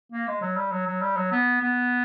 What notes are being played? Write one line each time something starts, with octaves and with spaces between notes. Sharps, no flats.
A#3
G#3
F#3
G3
F#3
F#3
G3
F#3
B3
B3